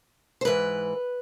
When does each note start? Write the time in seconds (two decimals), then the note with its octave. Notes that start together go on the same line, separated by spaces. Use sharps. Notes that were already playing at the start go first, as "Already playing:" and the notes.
0.41 C5
0.45 G#2 E3 B4